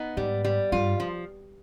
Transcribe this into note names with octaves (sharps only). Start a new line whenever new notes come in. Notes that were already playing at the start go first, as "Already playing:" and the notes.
Already playing: B3 D#4
G#2 G3
G3
G2 F4
F3